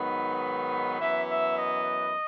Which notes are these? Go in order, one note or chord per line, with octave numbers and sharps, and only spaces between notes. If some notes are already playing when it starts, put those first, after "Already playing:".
Already playing: G#2 D#3 F#3 B3 B4
F#2 E3 B3 E5
E5
D#5